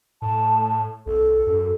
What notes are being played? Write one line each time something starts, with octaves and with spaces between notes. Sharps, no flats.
A2 A5
C2 A4
F#2